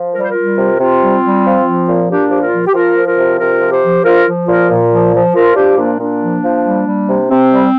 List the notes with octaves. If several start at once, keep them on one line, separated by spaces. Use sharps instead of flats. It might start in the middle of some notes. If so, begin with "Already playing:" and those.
Already playing: F3
G3 A#4
C5
F4 A#4
G3
C3
C3 C4 F4
G3
G3
F3
F3
A#2
A#2 D4 G4
F3 G4
F4 A#4
F3
G4
F3 F4 A#4
F3
F4 A#4
C3
C3 F4 A#4
F3
G4 C5
F3
F3 F4 A#4
F3
A#2 F4 A#4
A#2
F3
F3
F3 F4 A#4
F3 D4 G4
A#2 A#3 D4
A#2 A#3 D4
F3
F3
G3
G3
C3
C3 C4
G3